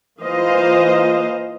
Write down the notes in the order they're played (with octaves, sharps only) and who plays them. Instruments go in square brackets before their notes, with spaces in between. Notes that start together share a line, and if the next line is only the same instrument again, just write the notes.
[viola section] E3 A#3 F4 C5 D#5 F5